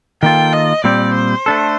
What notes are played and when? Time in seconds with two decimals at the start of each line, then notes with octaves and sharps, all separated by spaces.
0.22 D#3 A#3 F4 A4 G5
0.53 D#5
0.84 A#2 G3 C4 G4 D5
1.15 C5
1.46 A3 D4 A4